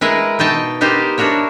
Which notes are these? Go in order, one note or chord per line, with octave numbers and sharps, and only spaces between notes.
G#3 E4 A#4 B4
B2 D#4 G5 A5
B3 D#4 G4 A#4 C5
D4 E4 F#4 A#4 C#5